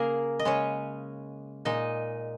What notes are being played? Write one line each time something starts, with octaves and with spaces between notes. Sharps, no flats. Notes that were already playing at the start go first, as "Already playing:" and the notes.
Already playing: C#3 A#3 G#4 A#4
D#5
C#3 G#3 C#4 C#5
A#2 G#3 D#4 D#5